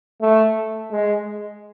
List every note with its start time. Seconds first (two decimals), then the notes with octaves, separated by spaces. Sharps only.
0.21 A3
0.91 G#3